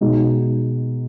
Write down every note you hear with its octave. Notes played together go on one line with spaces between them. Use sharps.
B2 G#3 D#4